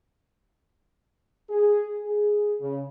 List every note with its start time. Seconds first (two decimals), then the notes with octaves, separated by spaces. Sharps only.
1.49 G#4
2.03 G#4
2.60 C#3